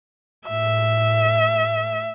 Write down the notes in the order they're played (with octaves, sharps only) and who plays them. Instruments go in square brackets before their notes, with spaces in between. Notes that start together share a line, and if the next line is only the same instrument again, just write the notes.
[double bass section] A2 [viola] E5